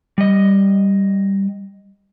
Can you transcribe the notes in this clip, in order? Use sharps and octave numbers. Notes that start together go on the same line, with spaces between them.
G3 D#5